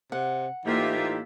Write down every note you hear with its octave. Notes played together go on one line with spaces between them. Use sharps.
C3 F#5
A2 E3 A#3 D#4 F4 G4 E5